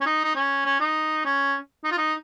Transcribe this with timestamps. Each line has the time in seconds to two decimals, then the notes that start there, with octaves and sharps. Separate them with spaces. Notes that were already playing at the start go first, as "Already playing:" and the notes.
0.01 C#4
0.06 D#4
0.25 D#4
0.35 C#4
0.65 C#4
0.80 D#4
1.25 C#4
1.84 D#4
1.92 F4
1.98 D#4